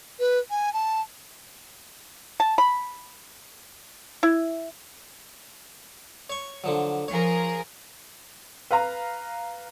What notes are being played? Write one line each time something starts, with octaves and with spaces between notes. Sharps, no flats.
B4
G#5
A5
A5
B5
E4
C#5 C#6
D3 F3 F#3
F3 G#4 A#4 C#5
B4 F5 A#5